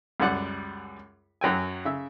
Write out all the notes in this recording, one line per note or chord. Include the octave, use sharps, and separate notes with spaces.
C#2 F#2 G3 F#5 D6
F#2 F#3 G5 G#5
C#3 E5